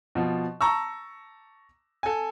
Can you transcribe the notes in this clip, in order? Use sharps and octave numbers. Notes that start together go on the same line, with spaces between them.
B2 F3
A5 A#5 C#6 E6
A4 G#5